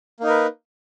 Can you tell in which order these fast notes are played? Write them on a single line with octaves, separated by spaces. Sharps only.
A#3 D#4 A#4 B4